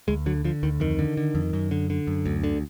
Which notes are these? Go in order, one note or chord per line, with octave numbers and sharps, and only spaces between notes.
D2 G#3
D3 F#3
D3 F3
D2 D#3
F2 D#3
D3
D3
F2
F#2
D3
D3
F#2
D2
D3